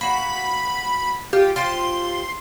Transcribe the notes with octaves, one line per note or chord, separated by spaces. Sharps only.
A#3 F#4 B5
F4 G4
F4 G4 C5 C6